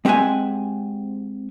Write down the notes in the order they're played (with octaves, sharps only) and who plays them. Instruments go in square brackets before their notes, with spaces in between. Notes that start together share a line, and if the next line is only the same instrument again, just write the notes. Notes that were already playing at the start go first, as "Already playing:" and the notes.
[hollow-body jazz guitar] G#3 C4 G4 E5 F#5 G#5